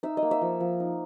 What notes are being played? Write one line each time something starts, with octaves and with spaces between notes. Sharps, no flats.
D#4 E5
D#5
A#3
E5
F3
F3
D#4